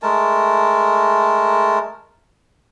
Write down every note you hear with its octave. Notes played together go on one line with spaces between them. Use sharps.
G#3 A3 A#4 A5